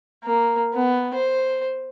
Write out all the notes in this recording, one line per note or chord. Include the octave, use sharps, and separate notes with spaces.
A#3
B3
C5